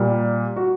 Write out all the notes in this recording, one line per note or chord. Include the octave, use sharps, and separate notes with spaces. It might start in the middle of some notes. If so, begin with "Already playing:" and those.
Already playing: A#2 G3
F#4